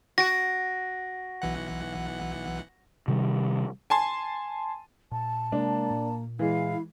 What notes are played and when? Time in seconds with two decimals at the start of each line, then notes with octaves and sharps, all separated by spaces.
0.18 F#4 A#6 D7
1.42 B1 E3 F#5
3.08 C3 D#3 G3
3.90 G#5 A5 C6
5.12 A#2 A5
5.52 C3 G#3 A#3 D4
5.91 A#2
6.39 E3 G#3 E4 F5